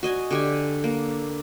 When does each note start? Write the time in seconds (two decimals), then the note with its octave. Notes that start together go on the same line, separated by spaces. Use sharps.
0.03 F#4 D#5 G#5
0.31 D3 G4 G#5
0.84 A#3